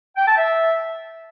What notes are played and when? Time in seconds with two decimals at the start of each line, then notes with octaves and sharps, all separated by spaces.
0.16 G5
0.27 A5
0.37 E5